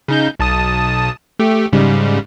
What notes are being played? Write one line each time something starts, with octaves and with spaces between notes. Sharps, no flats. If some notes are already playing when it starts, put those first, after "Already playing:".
C#3 D#4 G6
B1 A5 D#6
A3 G4
G#2 C#3 G3